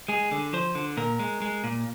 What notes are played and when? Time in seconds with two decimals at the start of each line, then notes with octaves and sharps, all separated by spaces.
0.08 G#3 G#4
0.32 D3
0.53 F3 C5
0.75 D3
0.97 A#2 A#4
1.19 G#3
1.42 G#3
1.64 A#2